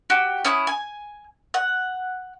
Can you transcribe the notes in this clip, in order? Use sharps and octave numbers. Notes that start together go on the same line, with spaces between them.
F#4 G4
C#4 E4 D#6 F#6
G#5
F#5